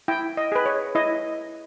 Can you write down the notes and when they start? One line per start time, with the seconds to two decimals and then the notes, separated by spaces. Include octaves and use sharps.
0.08 E4 G5
0.37 D#5
0.52 G#4 B4
0.66 C#5
0.95 E4 D#5